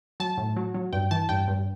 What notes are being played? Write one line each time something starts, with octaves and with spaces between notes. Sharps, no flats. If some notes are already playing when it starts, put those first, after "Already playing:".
F#3 A5
A2
F#3
F#3
G2 G5
E3 A5
G2 G5
G2